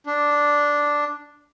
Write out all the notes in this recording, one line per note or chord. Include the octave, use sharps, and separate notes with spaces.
D4